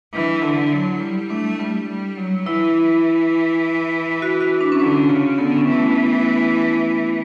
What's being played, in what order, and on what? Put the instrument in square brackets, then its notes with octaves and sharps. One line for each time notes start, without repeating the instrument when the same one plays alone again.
[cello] E3 [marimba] D4
[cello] D3
[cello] F#3 [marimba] E4
[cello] G3
[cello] A3 [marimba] D4
[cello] G3
G3
F#3
[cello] E3 [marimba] E4
[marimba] F#4
F#4
D4
C#4
[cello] D3 [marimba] D4
[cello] C#3
[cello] D3 [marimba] B3
[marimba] C#4
[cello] E3
[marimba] A3
B3
A3